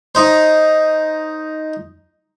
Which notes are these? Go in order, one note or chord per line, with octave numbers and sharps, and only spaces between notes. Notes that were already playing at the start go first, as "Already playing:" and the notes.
D#4 C5